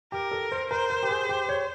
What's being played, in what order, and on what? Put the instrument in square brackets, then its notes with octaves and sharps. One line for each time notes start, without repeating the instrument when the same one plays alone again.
[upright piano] G4 [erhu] A#4
[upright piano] A4
C5
[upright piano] A#4 [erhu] C5
[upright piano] A#4
G4
G#4
G4
C#5